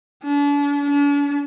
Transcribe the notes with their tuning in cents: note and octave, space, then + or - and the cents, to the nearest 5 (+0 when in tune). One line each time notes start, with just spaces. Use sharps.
D4 -40
D4 -45